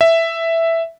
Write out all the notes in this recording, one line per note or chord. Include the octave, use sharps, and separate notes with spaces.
E5